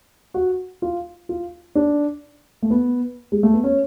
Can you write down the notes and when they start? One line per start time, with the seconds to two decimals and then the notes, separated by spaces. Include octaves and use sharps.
0.34 F#4
0.82 F4
1.29 F4
1.75 D4
2.62 A3
2.70 B3
3.32 G#3
3.43 A3
3.54 B3
3.64 C#4